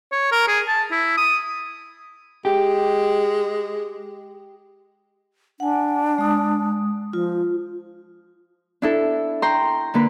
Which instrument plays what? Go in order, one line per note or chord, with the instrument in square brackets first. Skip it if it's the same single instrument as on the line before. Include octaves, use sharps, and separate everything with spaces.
[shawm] C#5
A#4
G#4
A5
E4
D#6
[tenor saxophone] G#3 [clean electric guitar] G4
[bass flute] D4 [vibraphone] F#5 G#5
[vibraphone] G#3 D#6
[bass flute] F3 [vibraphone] F4
[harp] D4 E4 A4
G5 A#5 C6 C#6
D3 A#3 B4